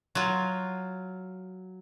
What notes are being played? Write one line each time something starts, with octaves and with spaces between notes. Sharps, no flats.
F#3 F4